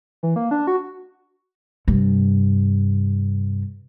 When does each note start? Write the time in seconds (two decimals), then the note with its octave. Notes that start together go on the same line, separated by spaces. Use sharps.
0.23 E3
0.36 A#3
0.51 D4
0.67 F#4
1.88 G2 C3